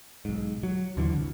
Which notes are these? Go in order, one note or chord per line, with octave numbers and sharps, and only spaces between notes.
B1 G#2
F#3
D#2 D3 E3 F#3
F#1 C2